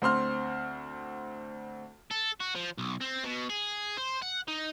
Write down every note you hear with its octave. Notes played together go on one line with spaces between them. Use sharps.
D2 C4 C6 F6
A4
F#4
F3
B1
C4
B2
G#4
C5
F#5
D#4